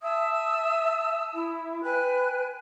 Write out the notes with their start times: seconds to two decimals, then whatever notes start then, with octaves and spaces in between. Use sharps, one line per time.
0.02 E5 A5 D#6 E6
1.33 E4
1.83 B4 G5 G#5 F#6